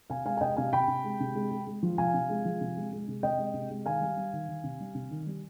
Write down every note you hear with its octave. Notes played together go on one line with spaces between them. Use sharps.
C3 F5 G#5
G#3 F5 G#5
G#5
C3 D#5 G5
C3 F5 G#5
C3 G5 B5
C3
G#3
C3
G#3
G#3
G#3
F3
C3 F5 G#5
C3
G#3
F3
C3
G#3
G#3
C3
C3 D#5 G5
G#3
C3
G#3
D#3 F5 G#5
G3
G3
D#3
D#3
C3
G3
C3
D#3
G3